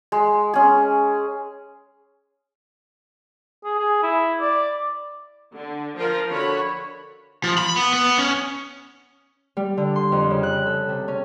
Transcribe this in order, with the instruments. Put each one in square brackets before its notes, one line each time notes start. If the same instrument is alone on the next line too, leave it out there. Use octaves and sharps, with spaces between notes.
[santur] G#3
C#4 G#4
[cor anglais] G#4
G#4
E4
D5
[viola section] D3
F3 F4 A#4
D3 F#4 C#5 B5
[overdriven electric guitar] F3
B5
B3
B3
C#4
[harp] G3
D3
C6
F2
C#3
F#6
A4
C3
C#4